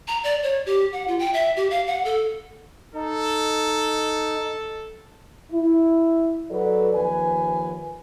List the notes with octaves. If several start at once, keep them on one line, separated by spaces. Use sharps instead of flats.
A#5
D5
C#5
G4
F#5
F4
G5
E5
G4
F5
F#5
A4
D#4 A4
E4
F#3 F#4 A4 B4 D5
D#2 F3 B4 G#5